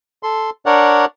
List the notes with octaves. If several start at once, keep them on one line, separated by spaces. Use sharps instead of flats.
A4 C6
D4 A#4 C#5 D5 F#5